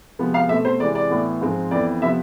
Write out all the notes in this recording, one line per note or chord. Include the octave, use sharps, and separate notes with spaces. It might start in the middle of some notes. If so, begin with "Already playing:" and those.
C3 F3 G#3 B3
F5
B2 A3 C4 E5
C5
C3 E3 G#3 D5
D5
A2 E3 B3
G#2 F3 G#3 C4
F2 E3 B3 D5
C3 F3 B3 E5